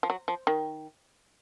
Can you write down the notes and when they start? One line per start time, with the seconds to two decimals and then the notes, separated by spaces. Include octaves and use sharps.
0.03 F3
0.10 F#3
0.28 F3
0.47 D#3